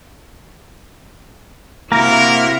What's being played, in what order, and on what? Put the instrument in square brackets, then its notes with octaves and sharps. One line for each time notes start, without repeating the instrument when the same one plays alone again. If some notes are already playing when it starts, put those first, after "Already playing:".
[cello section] C3 E4 F#4 [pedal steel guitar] A#3 [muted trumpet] A#4 [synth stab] A#5